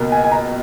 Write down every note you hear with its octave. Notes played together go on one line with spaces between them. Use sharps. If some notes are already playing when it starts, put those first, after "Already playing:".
Already playing: C#2 B2 A#3
G#5
G#5
A#5